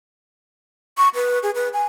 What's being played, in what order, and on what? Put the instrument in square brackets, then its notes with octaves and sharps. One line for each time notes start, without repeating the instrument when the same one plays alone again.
[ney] C#6
B4
G#4
B4
G#5